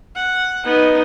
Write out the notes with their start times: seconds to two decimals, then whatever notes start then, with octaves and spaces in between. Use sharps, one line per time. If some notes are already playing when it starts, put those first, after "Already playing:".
0.15 F#5
0.66 B3 D#4